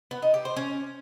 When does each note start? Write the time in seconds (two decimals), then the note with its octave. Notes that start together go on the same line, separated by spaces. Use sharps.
0.11 B3
0.22 D#4
0.34 G4
0.45 C5
0.57 C#4